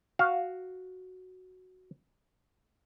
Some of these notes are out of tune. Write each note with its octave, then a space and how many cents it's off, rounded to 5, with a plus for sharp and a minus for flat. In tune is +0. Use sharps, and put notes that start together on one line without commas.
F#4 +0 F5 +0